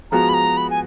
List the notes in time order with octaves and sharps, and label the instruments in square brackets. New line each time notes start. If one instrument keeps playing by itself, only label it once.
[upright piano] F3 G#3 B3 F#4 [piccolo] A#5
[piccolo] B5
A#5
B5
G#5